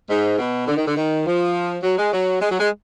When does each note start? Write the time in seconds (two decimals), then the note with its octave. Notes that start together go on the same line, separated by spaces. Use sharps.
0.09 G#2
0.38 B2
0.67 D3
0.77 D#3
0.87 D3
0.97 D#3
1.25 F3
1.83 F#3
1.98 G#3
2.12 F#3
2.41 G#3
2.51 F#3
2.60 G#3